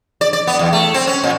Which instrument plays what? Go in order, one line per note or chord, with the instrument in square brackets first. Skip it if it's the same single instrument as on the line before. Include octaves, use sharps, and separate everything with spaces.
[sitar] D5
D5
B3
E2
A3
C4
C#4
A#2